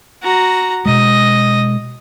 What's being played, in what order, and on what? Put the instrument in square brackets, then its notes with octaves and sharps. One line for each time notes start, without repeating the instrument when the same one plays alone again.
[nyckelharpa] F#4 A#5
[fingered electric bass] B2 G#3 [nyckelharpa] D#5